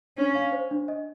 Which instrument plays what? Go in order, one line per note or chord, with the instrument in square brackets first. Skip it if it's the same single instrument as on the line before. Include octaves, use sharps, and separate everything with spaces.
[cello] C#4 [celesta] D4
[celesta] F5
C5
D4
D#5